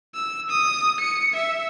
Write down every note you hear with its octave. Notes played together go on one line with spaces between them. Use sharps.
E6
D#6
C#7
E5